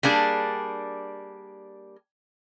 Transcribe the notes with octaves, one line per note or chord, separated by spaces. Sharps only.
G3 A#3 D4 G#4